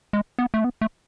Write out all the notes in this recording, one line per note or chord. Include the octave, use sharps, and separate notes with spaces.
G#3
B3
A3
B3
A3